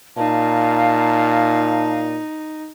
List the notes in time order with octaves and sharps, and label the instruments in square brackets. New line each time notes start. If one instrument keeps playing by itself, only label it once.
[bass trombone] A#2 [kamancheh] D#4 [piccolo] F5 [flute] A5